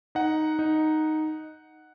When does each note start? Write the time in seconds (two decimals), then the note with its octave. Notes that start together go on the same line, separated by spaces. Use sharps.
0.15 D#4 F#5
0.59 D#4